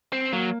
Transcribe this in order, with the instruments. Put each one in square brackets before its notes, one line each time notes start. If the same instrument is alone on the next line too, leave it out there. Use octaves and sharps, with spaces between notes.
[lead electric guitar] C4
[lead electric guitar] F#3 [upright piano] A#3